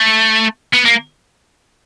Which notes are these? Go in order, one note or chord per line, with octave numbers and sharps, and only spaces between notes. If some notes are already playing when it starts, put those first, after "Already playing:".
Already playing: A3
B3
A#3